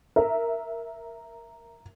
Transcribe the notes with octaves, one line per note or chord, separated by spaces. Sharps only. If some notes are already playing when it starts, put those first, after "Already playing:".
A#4 E5